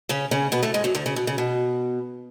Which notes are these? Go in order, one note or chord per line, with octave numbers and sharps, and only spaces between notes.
C#3 C#4
C#3 C#4
B2 B3
A2 A3
G#2 G#3
F#2 F#3
D2 D3
C#3
B2
C#3
B2